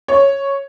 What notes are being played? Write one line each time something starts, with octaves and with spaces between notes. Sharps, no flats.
C#5